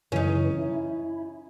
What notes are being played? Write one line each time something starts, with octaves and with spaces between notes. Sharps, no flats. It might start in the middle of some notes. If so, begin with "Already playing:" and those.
F#2 C#3 E3 C#4 D#4
E4